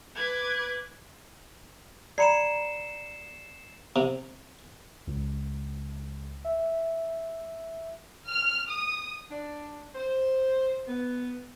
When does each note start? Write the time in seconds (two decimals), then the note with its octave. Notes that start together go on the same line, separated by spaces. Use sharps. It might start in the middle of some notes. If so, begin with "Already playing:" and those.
0.15 B4 D6 F#6 G#6
2.18 D5 A#5 B5 C7 C#7 E7
3.96 C3
5.07 C#2
6.45 E5
8.27 F6
8.70 D#6
9.30 D4
9.95 C5
10.87 B3